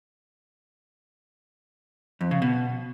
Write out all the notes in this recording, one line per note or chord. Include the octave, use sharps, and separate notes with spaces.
F2
C#3
B2